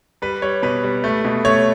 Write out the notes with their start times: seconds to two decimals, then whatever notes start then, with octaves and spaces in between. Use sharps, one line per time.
0.22 G3 B4
0.42 G3 C#5
0.63 B2 B4
0.83 G3
1.04 A3
1.25 B2
1.45 A3 C#5